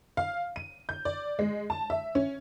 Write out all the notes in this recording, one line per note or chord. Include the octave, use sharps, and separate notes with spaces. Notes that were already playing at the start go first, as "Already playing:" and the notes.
F5
D#7
G6
D5
G#3
A5
E5
C#4